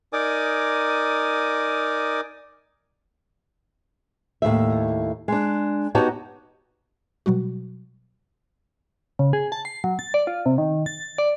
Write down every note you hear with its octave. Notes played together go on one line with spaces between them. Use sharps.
D#4 A#4 D5 G#5 D6 D#6
D#2 A2 F3 E5
G#3 D4
B3 D#4 F#4 G4 C#5 A5
B2 F#3 G3 F#4
C#3
G#4
A5
C7
F#3
A6
D5
F4
C3
D#3
A6
D5